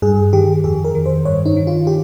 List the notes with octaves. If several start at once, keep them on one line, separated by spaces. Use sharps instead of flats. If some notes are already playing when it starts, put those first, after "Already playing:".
G2 G#4
D#3 G4
F2 G#4
A#4
D#3
C5
G2 C#5
D#4
D#3
F4
G4